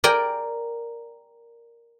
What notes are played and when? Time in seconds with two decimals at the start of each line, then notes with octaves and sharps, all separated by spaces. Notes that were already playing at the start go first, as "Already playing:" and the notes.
0.04 A#4 D5 G5 G#5